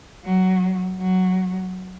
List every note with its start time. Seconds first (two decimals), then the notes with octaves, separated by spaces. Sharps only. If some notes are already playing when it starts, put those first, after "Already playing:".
0.24 F#3
1.00 F#3